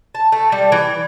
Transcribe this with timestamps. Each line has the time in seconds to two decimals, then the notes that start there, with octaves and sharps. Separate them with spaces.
0.15 A5
0.32 A3
0.52 G3
0.72 E3